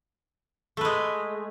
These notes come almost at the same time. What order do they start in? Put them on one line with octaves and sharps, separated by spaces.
A3 B4 G#3